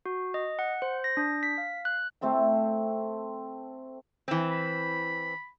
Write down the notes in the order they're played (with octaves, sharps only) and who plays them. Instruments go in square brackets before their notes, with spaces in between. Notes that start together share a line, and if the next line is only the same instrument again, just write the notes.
[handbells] F#4
D#5
F#5
C5
A#6
D4
B6
F5
F#6
[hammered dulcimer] A3 C4 A4 G5
[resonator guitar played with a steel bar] E3 C4
[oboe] B5